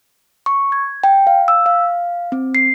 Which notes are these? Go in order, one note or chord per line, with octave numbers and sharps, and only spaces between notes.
C#6
G#6
G5
F5
E6
F5
C4
C7